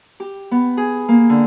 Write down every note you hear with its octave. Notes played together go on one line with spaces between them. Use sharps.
G4
B3
G#4
A#3
D3